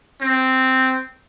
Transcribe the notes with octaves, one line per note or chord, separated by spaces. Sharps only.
C4